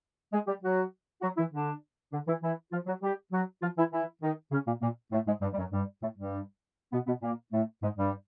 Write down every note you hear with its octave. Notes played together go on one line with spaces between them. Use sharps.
G#3 G#4
G3 G4
F#3 F#4
F#3 F#4
E3 E4
D3 D4
D3 D4
E3 E4
E3 E4
F3 F4
F#3 F#4
G3 G4
F#3 F#4
F3 F4
E3 E4
E3 E4
D#3 D#4
C#3 C#4
A#2 A#3
A#2 A#3
A2 A3
G#2 G#3
G2 G3
G3
F#2 F#3
G2 G3
A2 A3
G2 G3
B2 B3
B2 B3
A#2 A#3
A2 A3
G#2 G#3
G2 G3